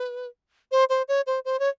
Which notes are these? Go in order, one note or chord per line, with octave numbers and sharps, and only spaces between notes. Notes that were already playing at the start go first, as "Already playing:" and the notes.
Already playing: B4
C5
C5
C#5
C5
C5
C#5